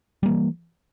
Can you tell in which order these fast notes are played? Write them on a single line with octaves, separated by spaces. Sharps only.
G3 A#3 E3